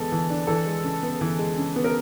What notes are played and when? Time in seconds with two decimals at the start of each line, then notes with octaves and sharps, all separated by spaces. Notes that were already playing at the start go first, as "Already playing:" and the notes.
Already playing: E3 G#3 B3 A4
0.12 E3
0.30 D4
0.47 E3 A4
0.66 G#3
0.84 C#3
1.03 B3
1.21 E3
1.39 G#3
1.58 C#3
1.76 B3
1.84 A#4